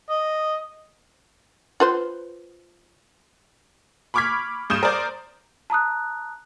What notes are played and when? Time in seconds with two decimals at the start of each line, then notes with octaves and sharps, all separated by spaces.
0.10 D#5
1.80 F4 B4 C5
4.14 B5 C#6 D6 F6 G#6 B6
4.70 G2 D#6 G6 E7
4.83 A#4 C5 D5
5.70 A5 A#5 D#6 F#6